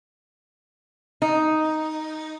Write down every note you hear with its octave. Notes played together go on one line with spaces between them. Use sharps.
D#4